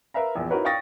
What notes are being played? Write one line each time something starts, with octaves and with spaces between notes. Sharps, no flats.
A#4 B4 E5 F5 A#5
A#1 E2
D#4 E4 F#4 A#4 B4 C#5
F5 G5 C#6 D#6 A6 A#6